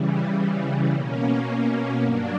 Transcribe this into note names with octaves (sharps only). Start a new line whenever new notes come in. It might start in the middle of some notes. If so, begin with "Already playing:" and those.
Already playing: C#3 E3 G3
B2 A#3 C#4
G2 F#3 A#3 D4